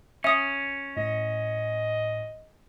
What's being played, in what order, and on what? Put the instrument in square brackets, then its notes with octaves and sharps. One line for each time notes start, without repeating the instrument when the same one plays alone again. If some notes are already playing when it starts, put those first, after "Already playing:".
[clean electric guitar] C#4 [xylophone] E5 D#6
[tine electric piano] A2 [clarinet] D#5